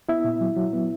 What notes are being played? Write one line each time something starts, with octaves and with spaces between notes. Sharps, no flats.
B3 E4 E5
A#2
F#3
F#3
B3